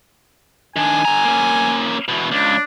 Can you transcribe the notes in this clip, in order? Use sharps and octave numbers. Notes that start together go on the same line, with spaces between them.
D#3 D4 G#5
D3 A#5
A#3 C#4
E2 B2
C#2 D4